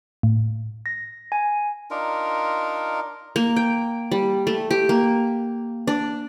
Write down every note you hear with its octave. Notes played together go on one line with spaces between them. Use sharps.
A2
A#6
G#5
D4 D#4 F4 A#4
A#3
G5
G3
A3
G4
A#3
D4